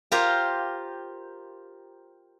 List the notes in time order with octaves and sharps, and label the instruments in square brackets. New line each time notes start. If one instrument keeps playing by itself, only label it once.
[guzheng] F4 G4 A#4 C5 F5